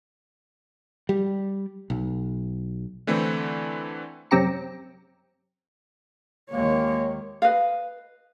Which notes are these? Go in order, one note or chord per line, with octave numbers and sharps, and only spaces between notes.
G3
B1
D3 E3 A3 C4 E4
F#2 C3 C4 G4 A#5 C#7
D#2 D#3 G#3 A#3 C#5
B4 D#5 F5